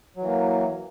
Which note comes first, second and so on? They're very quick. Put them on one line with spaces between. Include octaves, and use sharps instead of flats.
F#3 E3 A#3